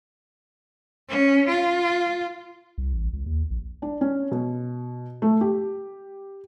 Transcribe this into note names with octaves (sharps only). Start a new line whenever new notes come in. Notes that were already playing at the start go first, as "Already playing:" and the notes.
C#4
F4
C2
A1
C#2
D#2
A#1
D4
C#4
B2
A3
G4